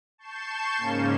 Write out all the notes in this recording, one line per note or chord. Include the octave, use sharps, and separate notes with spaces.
A5 C#6 G6 C7 E7
G#2 C#3 A#3 C#4